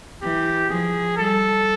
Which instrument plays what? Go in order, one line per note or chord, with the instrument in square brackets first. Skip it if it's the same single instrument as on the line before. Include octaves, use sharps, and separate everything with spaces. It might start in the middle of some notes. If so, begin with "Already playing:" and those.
[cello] E3 [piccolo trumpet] G4
[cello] F3 [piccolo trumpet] G#4
[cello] G3 [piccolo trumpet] A4